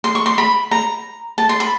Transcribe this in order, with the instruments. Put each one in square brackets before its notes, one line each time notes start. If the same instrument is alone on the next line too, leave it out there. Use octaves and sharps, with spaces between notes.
[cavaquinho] C6
C#6
C6
B5
A#5
A5
C6
B5